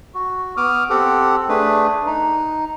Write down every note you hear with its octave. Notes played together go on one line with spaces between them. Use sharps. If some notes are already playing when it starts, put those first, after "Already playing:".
F#4
B3 D6 D#6 F6
C4 G4 A4 F#5
A3 D4 G#4 B4
D#4